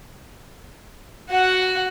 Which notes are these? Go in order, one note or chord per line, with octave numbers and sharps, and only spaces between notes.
F#4 F#5